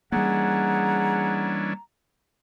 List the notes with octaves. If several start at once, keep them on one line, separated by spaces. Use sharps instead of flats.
E3 G3 A#3 C#4 D4 G#4 F#5 A#5